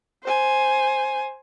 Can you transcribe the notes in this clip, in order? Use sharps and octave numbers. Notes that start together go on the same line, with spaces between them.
C5 G#5